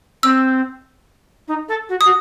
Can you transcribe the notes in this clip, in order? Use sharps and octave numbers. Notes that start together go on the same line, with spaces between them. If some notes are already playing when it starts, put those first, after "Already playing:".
C4 E6
D#4
A4
F#4
F#4 D#6